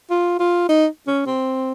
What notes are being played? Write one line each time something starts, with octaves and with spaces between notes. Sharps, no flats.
F4
F4
D#4
C#4
C4